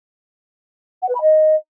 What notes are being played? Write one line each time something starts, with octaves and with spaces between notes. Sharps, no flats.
F#5
B4
B5
D#5